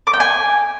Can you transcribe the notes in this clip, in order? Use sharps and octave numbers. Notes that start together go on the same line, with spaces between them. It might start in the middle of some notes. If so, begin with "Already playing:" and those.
D6
G5
G#5